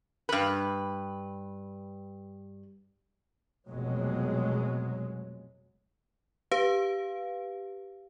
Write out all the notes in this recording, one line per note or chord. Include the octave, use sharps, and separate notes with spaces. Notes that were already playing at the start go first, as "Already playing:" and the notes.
G2 B4
F1 B2 F#3 G#3
G4 B4 F5